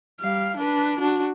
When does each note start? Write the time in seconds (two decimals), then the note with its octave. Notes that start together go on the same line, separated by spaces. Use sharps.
0.20 G3 F5
0.57 D4 B4
1.00 D4 F#4